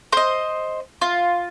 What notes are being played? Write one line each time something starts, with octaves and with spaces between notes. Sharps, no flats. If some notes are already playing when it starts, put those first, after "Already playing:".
C5 D#5
F4